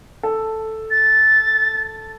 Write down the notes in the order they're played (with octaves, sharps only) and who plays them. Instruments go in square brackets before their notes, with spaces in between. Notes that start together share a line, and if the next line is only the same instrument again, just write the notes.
[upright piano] A4
[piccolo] A6